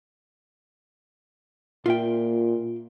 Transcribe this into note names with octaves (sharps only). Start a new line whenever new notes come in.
A#2 F4 E5 G5